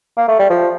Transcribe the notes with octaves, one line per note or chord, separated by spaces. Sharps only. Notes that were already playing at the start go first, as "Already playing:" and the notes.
A#3
A3
G3
F3